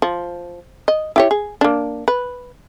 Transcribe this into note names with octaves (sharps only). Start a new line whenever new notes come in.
F3
D#5
E4 G4 C#5
G#4
A#3 D4
B4